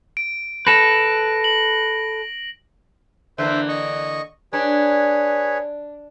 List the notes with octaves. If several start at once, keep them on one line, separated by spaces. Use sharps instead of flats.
D7
A4 B4 A#6
F#7
D3 E3 A#3 C5 E5
D#5 C#6
D4 G#4 B4 C#5